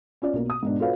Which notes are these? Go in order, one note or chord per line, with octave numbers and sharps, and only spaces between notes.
C#4 F4 D5
B1 A#3
D#6
G#2 B2 D4
F4 F#4 A4 B4 C#5 F5